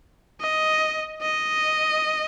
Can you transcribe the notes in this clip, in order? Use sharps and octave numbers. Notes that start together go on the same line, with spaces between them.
D#5
D#5